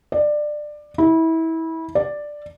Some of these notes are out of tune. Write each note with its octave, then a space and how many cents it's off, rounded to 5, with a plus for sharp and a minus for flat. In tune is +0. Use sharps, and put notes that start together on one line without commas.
D5 +20
E4 -25
D5 +5